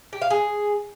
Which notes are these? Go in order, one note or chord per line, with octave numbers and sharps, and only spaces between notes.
G4
F5
G#4